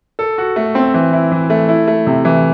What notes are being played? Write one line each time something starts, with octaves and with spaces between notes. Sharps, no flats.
A4
F#4
A3
C4
E3
E4
E3
A3
E4
A3
C3
E3